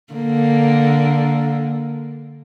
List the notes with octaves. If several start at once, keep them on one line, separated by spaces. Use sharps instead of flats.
D3 A#3